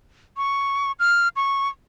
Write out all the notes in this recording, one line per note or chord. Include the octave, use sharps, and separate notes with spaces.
C#6
F6
C#6